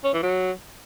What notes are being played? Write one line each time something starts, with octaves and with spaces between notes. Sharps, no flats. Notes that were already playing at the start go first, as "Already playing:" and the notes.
C#4
E3
F#3